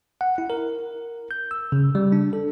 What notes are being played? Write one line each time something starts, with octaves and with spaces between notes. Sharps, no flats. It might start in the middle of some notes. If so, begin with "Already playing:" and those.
F#5
E4
A#4
G6
E6
C#3
G3
D4
A4